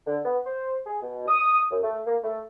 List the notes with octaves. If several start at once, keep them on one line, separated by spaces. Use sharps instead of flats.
D3
B3
C5
G#4
B2
D#6
F#2
A3
A#3
A3